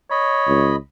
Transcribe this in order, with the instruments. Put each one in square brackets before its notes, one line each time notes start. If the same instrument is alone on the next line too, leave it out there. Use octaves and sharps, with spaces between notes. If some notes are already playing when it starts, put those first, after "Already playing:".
[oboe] C#5 [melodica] D#5 B5
[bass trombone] C#2